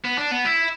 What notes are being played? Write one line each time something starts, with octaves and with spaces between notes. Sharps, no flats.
B3
D4
B3
E4